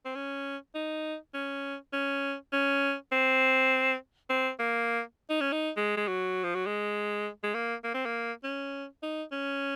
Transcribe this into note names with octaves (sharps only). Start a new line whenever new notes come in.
C4
C#4
D#4
C#4
C#4
C#4
C4
C4
A#3
D#4
C#4
D#4
G#3
G#3
F#3
F3
F#3
G#3
G#3
A#3
A#3
C4
A#3
C#4
D#4
C#4